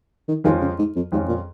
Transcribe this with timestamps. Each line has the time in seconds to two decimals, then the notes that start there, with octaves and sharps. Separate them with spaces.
0.28 D#3
0.44 F2 D#3 F3 G#3 C#4 F4
0.61 C#3
0.79 G#2
0.96 F2
1.12 F2 G#2 F3 G#3 C#4 F4
1.28 A#2